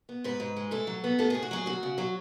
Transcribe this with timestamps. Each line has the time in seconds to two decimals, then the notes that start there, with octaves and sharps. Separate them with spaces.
0.09 B3
0.24 G#2 B4
0.40 G#2
0.56 G#3
0.71 A2 A4
0.87 F#3
1.04 B3
1.19 A2 A4
1.30 A2 G#4
1.42 F#4
1.51 F#3 G#4
1.66 D2 F#4
1.83 C#3
1.98 F#3